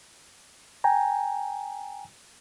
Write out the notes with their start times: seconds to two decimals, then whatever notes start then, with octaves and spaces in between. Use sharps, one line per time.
0.84 G5 G#5 A#5